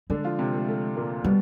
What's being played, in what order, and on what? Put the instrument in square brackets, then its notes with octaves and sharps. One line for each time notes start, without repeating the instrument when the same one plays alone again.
[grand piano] D3 D4 [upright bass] G#3
[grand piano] F3 F4
C3 C4
A3
A3
A#2 A#3
[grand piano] B2 B3 [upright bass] G3